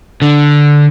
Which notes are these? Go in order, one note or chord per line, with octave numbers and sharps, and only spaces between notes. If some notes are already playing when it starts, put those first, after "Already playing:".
D3